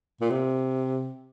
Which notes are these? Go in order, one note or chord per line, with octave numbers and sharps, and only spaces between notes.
A#2
C3